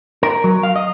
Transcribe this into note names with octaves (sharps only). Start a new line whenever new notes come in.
A#4
F#3
F5
D#5